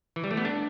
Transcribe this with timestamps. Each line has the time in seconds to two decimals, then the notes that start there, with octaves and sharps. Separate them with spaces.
0.16 E3
0.24 G3
0.31 A3
0.37 B3
0.45 D4